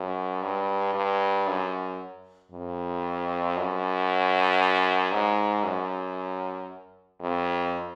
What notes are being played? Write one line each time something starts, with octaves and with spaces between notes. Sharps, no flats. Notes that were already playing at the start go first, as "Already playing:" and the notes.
Already playing: F#2
G2
G2
F#2
F2
F#2
G#2
F#2
F2